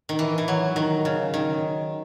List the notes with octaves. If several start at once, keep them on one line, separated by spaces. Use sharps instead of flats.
D#3
E3
E3
F#3
D#3
C#3
D#3